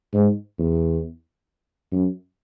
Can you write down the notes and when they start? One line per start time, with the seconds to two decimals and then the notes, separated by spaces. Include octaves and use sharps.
0.14 G#2
0.59 E2
1.92 F#2